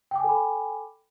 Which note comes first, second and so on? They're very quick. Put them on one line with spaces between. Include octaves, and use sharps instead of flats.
G5 D6 G#5 A4 B5